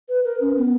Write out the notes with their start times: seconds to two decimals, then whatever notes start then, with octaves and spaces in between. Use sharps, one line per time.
0.09 B4
0.24 A#4
0.41 C#4
0.58 B3